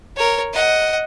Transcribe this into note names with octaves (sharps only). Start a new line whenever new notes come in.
A#4 C#5
D#5 F#5